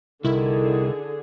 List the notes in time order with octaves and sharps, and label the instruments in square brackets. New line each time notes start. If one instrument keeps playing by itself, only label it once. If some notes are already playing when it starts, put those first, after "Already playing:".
[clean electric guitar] C2 [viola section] D3 G#4 [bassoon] D#3 [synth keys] E4